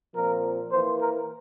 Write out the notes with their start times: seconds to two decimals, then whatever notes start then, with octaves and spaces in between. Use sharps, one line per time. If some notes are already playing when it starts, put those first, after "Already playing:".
0.15 A#2 F3 C4 A#4
0.71 E3 A#3 C5
1.00 A#4